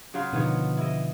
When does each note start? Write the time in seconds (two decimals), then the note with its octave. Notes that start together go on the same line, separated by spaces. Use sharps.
0.14 C#3 F#3 F4
0.33 B2 D3 D#3 F3 B3 C#5
0.77 E4 D#5